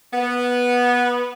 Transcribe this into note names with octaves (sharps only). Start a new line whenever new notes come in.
B3